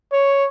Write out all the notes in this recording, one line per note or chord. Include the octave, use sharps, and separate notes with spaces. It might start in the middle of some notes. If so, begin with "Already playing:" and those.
C#5